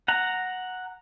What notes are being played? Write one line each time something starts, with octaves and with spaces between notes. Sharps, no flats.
F#5 A#5